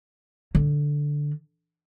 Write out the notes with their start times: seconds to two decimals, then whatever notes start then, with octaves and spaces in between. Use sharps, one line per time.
0.55 D3